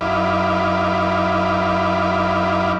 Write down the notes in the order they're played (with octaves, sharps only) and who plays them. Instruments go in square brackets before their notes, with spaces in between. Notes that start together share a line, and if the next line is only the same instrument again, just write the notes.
[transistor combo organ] F#2 D#4 E4 F5 B5 D6